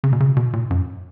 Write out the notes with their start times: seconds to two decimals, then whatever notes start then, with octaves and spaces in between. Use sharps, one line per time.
0.04 C#3
0.13 B2
0.20 C#3
0.37 B2
0.53 A#2
0.70 F#2